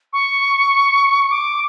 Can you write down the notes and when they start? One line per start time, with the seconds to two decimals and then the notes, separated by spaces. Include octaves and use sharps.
0.13 C#6
1.30 D6